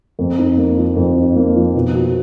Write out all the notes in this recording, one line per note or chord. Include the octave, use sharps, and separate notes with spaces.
F2
D#4
A#3
F3
F2
D#4
A#3
F3
B2
F#4